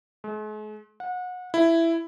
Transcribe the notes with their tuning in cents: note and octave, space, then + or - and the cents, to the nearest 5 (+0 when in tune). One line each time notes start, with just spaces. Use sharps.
G#3 +45
F#5 -30
E4 +10